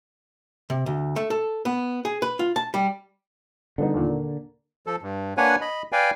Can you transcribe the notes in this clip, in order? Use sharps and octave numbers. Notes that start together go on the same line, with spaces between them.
C3
D2
A3
A4
B3
G#4
B4
F4
A5
G3
D3 G3 B3 D#4
D#2 A#2
A#3
F3 A4
G2
A#3 D4 B4 C#5 F#5 G#5
D#5 B5
B4 D5 F5 G5 G#5